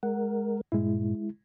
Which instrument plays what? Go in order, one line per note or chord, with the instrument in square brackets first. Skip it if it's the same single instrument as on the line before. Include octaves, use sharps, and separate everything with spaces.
[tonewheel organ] G#3 A#4 [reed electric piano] F#5
[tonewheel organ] G2 A#2 [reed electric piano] G#3 E4